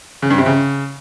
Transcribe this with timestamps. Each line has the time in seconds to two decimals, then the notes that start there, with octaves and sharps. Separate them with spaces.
0.22 C#3
0.30 G2
0.38 C3
0.46 C#3